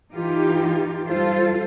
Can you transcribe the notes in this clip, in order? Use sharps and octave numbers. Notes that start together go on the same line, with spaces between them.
E3 D#4 F4 G4
G3 F4 A4 C5